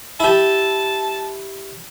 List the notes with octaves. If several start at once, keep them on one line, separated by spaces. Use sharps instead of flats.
E4 G4 A5